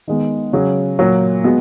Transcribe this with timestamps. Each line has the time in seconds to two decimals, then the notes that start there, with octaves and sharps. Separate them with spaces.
0.08 D#3 G#3 B3
0.53 C#3 F#3 C#4 G#4
0.99 A#2 F#3 A#3
1.44 G#3 B3 F#4